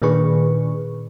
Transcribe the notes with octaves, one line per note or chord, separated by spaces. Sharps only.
A#2 D#3 D4 G#4 B4 C#6